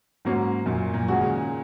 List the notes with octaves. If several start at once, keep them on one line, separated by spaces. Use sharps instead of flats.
G#2 F#3 A#3 C#4
F#2 A#2
A#2
D#3 G#3 C#4 F#4
C#3